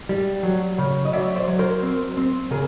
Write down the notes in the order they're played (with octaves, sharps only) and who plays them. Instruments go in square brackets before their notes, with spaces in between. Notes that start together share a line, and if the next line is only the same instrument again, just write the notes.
[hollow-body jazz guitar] G3
F#3
C#3
D#5
F#3 D5 E5
C5 D5
F#3
A#4 C5
C4
C4
C#3 G#4 A#4